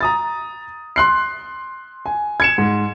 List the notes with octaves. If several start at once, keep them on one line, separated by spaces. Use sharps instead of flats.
A#5 D#6 A6
C6 F#6 C7
G#5
G#6 C#7 E7
G#2